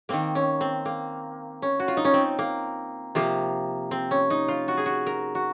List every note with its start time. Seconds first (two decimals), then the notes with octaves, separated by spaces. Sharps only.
0.09 D#3 A#3 C4
0.35 C#4
0.61 C4
0.85 A#3
1.62 C#4
1.80 F#4
1.88 F4
1.97 D#4
2.05 C#4
2.13 C4
2.39 A#3
3.15 C3 F3 A#3
3.91 C4
4.11 C#4
4.30 D#4
4.48 F4
4.68 F#4
4.77 G#4
4.86 F#4
5.06 A#4
5.35 F#4